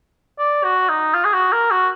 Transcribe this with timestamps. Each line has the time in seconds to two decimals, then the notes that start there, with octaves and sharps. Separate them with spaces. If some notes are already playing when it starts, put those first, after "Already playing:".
0.39 D5
0.64 F#4
0.89 D#4
1.14 F4
1.25 G#4
1.33 F#4
1.52 A#4
1.71 F#4